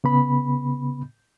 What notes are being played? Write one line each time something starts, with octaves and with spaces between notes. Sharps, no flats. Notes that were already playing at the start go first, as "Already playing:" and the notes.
C#3 B3 B5